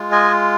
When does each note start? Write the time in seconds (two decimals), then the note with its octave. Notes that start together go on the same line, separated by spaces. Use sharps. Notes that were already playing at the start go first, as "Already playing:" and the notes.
Already playing: G#3 F4
0.12 D#5 G#5